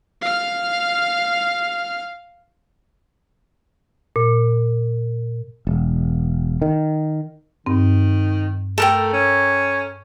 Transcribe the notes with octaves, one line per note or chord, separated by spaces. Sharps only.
F5 F6
A#2
E1
D#3
G2 D#3 C4
A3 A4 A#4 G5
C#4